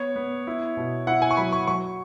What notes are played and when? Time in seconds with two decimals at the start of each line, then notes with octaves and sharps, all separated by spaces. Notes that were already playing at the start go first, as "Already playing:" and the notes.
Already playing: B3 C#5
0.16 B3
0.47 E4
0.77 B2
1.07 E4 F#5
1.22 G#5
1.31 C#6
1.37 F#3 B5
1.52 C#6
1.67 F#3 C#6